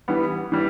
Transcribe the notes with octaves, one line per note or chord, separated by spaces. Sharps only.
E3 G3 B3
E3 G3